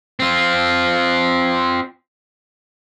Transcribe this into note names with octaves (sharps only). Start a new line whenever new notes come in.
C4 F4